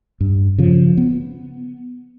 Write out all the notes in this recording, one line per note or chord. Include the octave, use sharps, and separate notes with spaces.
G2
C#3 F3
B3